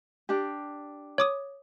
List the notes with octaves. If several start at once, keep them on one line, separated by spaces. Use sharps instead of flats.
D4 G4
C#5 D6 D#6